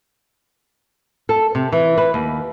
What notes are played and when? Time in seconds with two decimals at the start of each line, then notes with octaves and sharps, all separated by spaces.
1.29 A4
1.55 C3
1.72 E3
1.97 B4
2.14 D#2